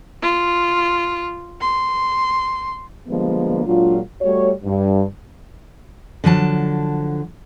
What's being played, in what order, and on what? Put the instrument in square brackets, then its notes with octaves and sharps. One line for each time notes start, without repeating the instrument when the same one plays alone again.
[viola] F4
C6
[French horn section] D3 F3 G3 G#3 A#3 B3
A#2 F#3 G#3 D4 F4
G3 A3 F#4 C#5
G2
[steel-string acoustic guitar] D3 F3 F#3 A5